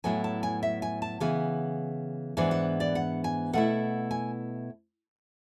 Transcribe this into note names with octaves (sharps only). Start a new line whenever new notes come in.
A2 F#3 B3 E4 G#5
A5
G#5
E5
G#5
A5
C#3 E3 B3 G#5
G#2 E3 B3 D4 G#5
F#5
D5
F#5
G#5
B2 A3 E4 F#5
G#5